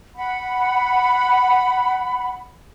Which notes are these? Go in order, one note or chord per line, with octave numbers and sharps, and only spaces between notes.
F#5 B5